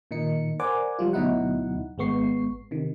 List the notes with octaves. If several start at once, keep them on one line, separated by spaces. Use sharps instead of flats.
A#2 D#3 D#4 C#7
A#4 C5 D5 F#5 G#5 D6
F3 G3 F4
D2 B2 F#3 D#4 E4 F#5
G#1 G#3 B3 C#6 C7
C3 D#3